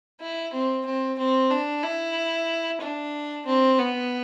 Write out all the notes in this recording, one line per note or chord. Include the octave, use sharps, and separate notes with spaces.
E4
C4
C4
C4
D4
E4
D4
C4
B3